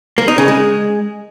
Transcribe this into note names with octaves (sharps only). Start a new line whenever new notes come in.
A#3
D#4
C#3
G#3